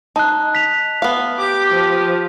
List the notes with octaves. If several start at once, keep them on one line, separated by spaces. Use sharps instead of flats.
D#4 A5 F#6
B6 F7
B3 F5
G4 D6
F3